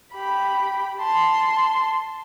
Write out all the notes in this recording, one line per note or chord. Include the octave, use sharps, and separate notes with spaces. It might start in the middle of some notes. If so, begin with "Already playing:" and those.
G4 B5
A5 C6